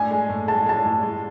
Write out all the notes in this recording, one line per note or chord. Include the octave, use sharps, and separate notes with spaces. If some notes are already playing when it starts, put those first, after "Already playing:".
Already playing: A2 D4 G#5
G#3
A2
G#3 A5
G#3 A5
A2
G#3